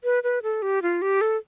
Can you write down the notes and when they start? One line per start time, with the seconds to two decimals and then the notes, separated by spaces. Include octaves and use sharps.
0.04 B4
0.23 B4
0.43 A4
0.62 G4
0.82 F4
1.02 G4
1.21 A4